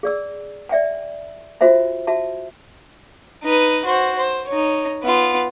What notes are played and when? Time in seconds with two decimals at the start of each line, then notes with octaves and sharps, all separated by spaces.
0.03 G#4 D5 E6
0.69 D5 E5 G5 G#5
1.61 F4 F#4 C5 E5 G#5
2.07 F#4 E5 A5
3.43 D#4 B4
3.85 F#4 C5
4.18 C5
4.48 D#4 C#5
5.03 B3 F4